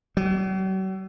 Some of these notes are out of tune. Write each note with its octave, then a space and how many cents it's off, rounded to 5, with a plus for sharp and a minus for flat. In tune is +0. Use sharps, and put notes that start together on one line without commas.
F#3 +45